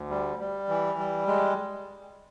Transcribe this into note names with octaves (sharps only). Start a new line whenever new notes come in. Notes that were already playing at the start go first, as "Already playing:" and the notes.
Already playing: D2
G3
G3
E3
G3
G#3